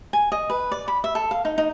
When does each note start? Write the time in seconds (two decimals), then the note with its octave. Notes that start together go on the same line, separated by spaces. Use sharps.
0.13 G#5
0.32 D#5
0.50 B4
0.72 D5
0.88 B5
1.04 E5
1.15 A4
1.31 F5
1.45 D#4
1.58 D#4